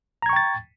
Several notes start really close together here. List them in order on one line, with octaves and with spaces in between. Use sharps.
A#5 G#6 C#6 G5 A6